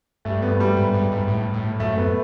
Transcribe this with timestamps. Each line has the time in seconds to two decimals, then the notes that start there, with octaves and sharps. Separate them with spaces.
0.25 G2 A3
0.42 B3
0.60 G3
0.77 G#2
0.94 G2
1.12 G#2
1.28 A2
1.54 A2
1.80 F#2 A3
1.98 B3